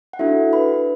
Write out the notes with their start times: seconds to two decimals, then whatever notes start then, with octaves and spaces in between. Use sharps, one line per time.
0.13 F#5
0.19 D4 E4 F#4 A4 E5
0.53 B4 B5